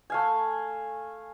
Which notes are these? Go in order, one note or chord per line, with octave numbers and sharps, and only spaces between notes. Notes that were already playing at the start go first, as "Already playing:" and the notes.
A3 F5 G#5